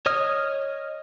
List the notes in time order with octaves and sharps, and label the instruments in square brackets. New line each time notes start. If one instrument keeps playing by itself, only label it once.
[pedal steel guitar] C#5 D#5 D#6 F6